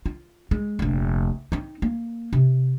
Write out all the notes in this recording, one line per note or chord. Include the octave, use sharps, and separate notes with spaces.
F4
G#3
F1 A#1
C4 D#4
A#3
C3